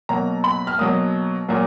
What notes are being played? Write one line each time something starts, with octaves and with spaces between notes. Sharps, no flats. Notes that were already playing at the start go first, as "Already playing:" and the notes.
B2 F#3 A#3 A#5
B5
F6
B2 F#3 A#3 D#6
A#2 F#3 A#3